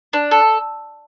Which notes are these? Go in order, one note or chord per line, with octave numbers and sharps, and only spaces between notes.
D4
A4